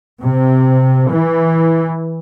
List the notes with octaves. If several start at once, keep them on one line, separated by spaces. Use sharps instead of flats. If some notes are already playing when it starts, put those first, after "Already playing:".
C3
E3